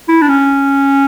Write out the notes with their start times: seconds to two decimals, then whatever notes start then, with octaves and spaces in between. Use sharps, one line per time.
0.08 E4
0.22 D4
0.28 C#4